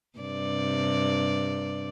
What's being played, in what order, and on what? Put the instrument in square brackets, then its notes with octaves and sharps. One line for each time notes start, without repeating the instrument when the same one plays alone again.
[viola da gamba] G2 C3 D5